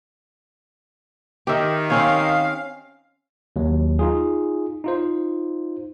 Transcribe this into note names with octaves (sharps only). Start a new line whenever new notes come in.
D#3 G4 E5
C4 C#4 C#5 F5
D#2 F#3
D#4 F4 G#4
D#4 F4 C5